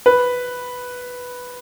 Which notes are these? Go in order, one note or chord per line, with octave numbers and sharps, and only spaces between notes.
B4